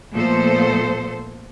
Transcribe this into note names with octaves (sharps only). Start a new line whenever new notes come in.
A#2 F3 A3 B3 A4 C5